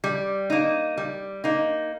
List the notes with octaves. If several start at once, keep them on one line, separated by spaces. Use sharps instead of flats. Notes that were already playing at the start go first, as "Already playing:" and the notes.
G3
A#3 D#4
G3
A#3 D#4